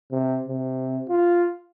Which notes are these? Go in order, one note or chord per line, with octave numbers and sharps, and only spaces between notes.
C3
C3
F4